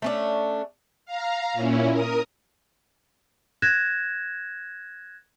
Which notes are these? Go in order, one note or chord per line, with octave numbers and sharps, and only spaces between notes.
A3 C#4 D4
F5 A#5
A#2 C#4 E4
A#4 D#6
F#6 G#6 A#6 E7